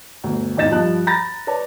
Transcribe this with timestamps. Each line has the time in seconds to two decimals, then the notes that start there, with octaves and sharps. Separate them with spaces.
0.24 G1 D2
0.57 G#1 E2 D#4 D#5 A6 E7
0.71 G2 F3 G3 D#5 A5 F#6
1.07 A#5 B5 A6 A#6
1.47 B4 C#5 D5 A5